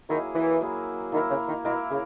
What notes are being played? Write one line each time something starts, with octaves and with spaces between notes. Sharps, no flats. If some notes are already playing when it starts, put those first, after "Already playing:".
D#3 F#3 A#3 E4 G#4
E3
F#3 A#3 E4 G#4
D#3 A#3 E4 A#4
C#3
D#3
B2 A#3 E4 A#4
C#3